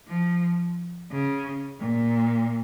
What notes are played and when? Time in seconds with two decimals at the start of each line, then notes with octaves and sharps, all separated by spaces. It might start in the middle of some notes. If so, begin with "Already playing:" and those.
0.08 F3
1.11 C#3
1.80 A#2